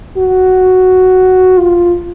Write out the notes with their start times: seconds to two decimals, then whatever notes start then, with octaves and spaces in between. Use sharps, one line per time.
0.18 F#4
1.58 F4